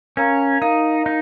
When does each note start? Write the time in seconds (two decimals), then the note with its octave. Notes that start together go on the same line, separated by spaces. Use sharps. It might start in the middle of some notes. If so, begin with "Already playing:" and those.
0.17 C#4 A#4 F5 A#5
0.62 D#4 A#4 F5 A#5
1.06 D#4